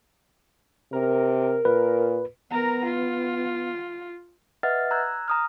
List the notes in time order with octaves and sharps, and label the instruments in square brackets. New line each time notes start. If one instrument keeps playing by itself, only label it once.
[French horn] C3 [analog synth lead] A#4
[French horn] A#2 [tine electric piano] B4
[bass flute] B3 [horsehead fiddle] A#4 A#5
[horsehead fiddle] F4
[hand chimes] B4 D#5 E5 F#5 F6 A6
A#5 E6 F#6 G#6
A#5 D#6 F6